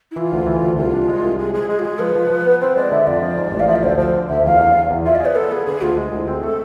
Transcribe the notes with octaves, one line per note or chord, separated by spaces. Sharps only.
E4
E3 F4
D2
E3
D2
C2 F4
D4
G#3
C2
G#3 G#4
G#3 G#4
G#3 G#4
F4
G#3 G#4
F3 B4
F3
F3
B3
C4 C5
G#3 D5
D3 E5
F2 D5
F3
G#2
A1
F5
F3 E5
D5
D2 C5
F3 C5
D3
D2 E5
E2 F5
E2
E2
E2
F4 E5
D5
G#4
B4
B3 A4
B3 G#4
D3 G#4
D2 F4
G#3
D2 E4
C4 G#4
A3 A4